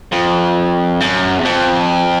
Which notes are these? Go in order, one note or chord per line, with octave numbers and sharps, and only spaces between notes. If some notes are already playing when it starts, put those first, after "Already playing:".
F2
F#2
E2
F2